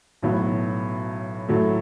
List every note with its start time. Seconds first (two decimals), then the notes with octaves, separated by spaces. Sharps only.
0.22 B1 A2 F#3 B3
1.49 A2 F#3 A3